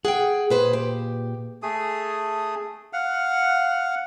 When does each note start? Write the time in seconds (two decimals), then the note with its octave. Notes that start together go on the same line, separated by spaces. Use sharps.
0.05 G#4 F#5 G5
0.50 A#2 G#4 B4 C5
0.73 G4
1.63 A3 G#4 D#6
2.93 F5 F#5